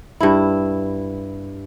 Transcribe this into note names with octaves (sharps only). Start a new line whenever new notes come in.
G2 E4